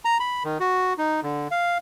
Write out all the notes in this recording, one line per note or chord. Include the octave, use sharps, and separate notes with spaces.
A#5
B5
D#3
F#4
D#4
D3
F5